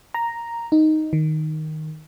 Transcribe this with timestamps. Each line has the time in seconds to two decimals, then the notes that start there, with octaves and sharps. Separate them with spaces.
0.14 A#5
0.72 D#4
1.13 D#3